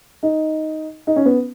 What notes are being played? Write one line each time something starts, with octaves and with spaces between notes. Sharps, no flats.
D#4
D#4
C#4
B3